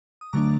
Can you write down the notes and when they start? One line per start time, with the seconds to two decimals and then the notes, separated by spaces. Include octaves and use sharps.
0.21 D#6
0.33 D3 F#3 A3 D4 A#5 D6